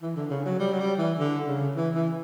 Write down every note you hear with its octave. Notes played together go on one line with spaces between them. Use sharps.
E3
D3
C#3
F#3
G3
F#3
G3
E3
D3
C#3
E3
E3